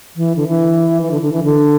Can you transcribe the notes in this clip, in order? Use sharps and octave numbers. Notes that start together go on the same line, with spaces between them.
E3
D3
E3
E3
D3
D3
E3
D3